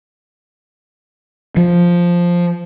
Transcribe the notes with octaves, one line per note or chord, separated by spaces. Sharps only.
F3